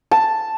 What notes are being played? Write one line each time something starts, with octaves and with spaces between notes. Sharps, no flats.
A5